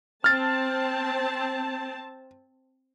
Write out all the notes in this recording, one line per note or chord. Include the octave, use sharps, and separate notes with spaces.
C4 A5 F6 A6